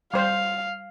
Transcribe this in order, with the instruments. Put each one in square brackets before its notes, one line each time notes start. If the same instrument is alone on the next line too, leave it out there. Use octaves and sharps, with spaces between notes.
[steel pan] G3 C5 [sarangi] F5